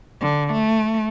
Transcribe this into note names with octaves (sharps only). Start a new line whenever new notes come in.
D3
A3